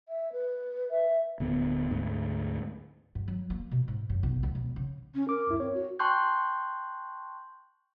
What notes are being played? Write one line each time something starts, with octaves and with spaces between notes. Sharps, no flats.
E5
B4
E5
D1 D3 B3
D2 G#2
G2
F#3
A#3
B2
G#2
F#2
B1
C#2
B1
C#3
C#4
A#4 D6
D2 G2 E4
C4 C#5
F#4
G5 A5 C6 C#6 F#6 G6